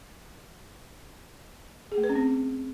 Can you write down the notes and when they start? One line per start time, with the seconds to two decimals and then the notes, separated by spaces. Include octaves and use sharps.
1.92 G#4
1.98 A3
2.04 B4
2.10 C#4
2.15 C4